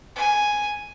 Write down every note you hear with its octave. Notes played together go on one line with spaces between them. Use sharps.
G#5